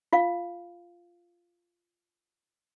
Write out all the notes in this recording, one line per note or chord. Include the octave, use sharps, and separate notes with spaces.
F4 F5